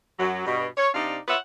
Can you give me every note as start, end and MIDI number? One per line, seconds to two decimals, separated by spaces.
0.19 0.45 42
0.19 0.45 54
0.46 0.66 43
0.46 0.66 47
0.77 0.89 73
0.94 1.18 48
0.94 1.18 62
0.94 1.18 63
0.94 1.18 74
0.94 1.18 77
1.28 1.37 65
1.28 1.37 71
1.28 1.37 73
1.28 1.37 76
1.28 1.37 78